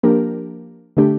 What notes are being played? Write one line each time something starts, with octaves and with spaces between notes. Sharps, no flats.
F3 A#3 D4 G4 A#4
D3 A3 D4 G4